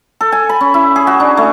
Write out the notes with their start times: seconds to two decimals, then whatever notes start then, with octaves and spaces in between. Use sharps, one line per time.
0.21 A4
0.32 G#5
0.49 B5
0.61 C#4
0.74 E4
0.96 G#4
1.07 F#4
1.20 D4
1.37 A3